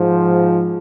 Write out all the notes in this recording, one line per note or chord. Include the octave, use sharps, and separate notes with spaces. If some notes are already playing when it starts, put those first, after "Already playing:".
Already playing: G#2 F3